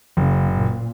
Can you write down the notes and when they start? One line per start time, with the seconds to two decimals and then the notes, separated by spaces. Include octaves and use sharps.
0.17 F#1 C#3
0.52 A#2